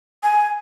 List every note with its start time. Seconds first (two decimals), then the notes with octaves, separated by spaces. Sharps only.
0.23 G#5